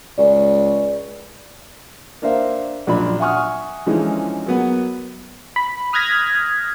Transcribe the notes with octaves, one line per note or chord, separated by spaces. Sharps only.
C#2 D5
A#3 D4 A#4 C5 E5 F5
A#1 F#2 A#2 D4 B5
E5 F#5 G#5 C#6 D#6 F6
D3 E3 F3 G#3 C#4 D#4
F#3 A#3 B3 F#5
B5
D#6 F6 F#6 G#6 A#6 B6